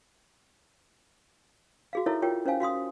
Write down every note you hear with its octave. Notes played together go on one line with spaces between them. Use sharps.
F#4 G#4 F5
D#4 E4 A4 A#4 C#5 E5
F4 G4 A#4 C#5 G5
C#4 C5 C#5 F5 G#5
F#4 F5 C6 D#6